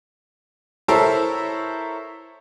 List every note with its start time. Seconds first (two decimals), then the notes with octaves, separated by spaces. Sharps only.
0.88 E4 A4 A#4 C5 C#5 E5